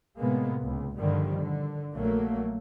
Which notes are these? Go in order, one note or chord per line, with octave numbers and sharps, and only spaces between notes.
A2 C3 G#3 A#3 B3
C#2
G2 A#2 D3 D#3 F3 G3
D3
A#1 F#3 A3 A#3